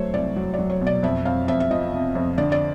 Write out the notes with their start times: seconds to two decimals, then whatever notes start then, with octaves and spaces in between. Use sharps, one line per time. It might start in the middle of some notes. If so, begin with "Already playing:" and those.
Already playing: F#3 A3 C5 C#5
0.14 C2 D5
0.36 F#3
0.54 D5
0.59 F#3
0.70 C#5
0.81 B2
0.87 D5
1.03 F2 E5
1.25 F2 F5
1.48 F2 E5
1.60 E5
1.71 F3 D#5
1.93 C3
2.15 F2
2.38 D3 D5
2.52 D5